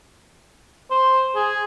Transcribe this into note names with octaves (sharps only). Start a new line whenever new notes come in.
C5
G#4